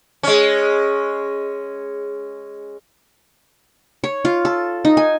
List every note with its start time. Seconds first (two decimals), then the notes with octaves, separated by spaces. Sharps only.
0.23 G#3 C#4
4.04 C#5
4.25 F4
4.45 A4
4.85 D#4
4.97 G#5